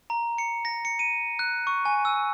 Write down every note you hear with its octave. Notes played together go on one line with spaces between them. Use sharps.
A#5
C#7
A#6
C#7
D#7
F#6
C#6
G#5
E6